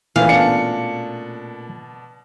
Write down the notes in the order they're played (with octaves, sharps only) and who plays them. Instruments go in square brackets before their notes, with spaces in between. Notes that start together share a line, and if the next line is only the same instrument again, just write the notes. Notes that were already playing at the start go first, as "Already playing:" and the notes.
[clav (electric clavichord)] A#2 A3 C#4 [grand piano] E3 [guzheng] F5
[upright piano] B2 D4 [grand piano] C#7